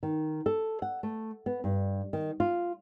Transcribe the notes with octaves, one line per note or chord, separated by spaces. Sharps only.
D#3
A4
F#5
A3
B3
G2
D#3
F4